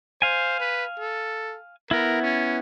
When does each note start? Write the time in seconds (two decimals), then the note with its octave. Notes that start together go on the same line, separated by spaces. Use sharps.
0.22 C5 F5 G#5
0.60 B4
0.99 A4
1.91 B3 E4 A#4
2.22 C#4